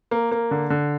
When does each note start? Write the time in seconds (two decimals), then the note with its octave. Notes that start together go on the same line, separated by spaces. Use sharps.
0.11 A#3
0.31 A#3
0.51 D3
0.70 D3